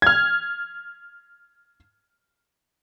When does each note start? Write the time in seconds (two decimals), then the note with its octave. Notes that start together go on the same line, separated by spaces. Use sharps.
0.02 F6 G#6